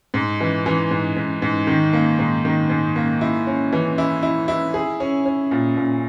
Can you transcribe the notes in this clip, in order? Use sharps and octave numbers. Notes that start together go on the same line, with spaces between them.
G#2
E3
E3
G#2
G#2
G#2
D#3
A#3
G#2
D#3
G#2
A#3
E4
C#4
E3
E4
E4
E4
G#4
C#4
C#4
A#2
A#2